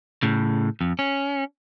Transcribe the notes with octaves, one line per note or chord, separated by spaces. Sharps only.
A2 C#3
F2
C#4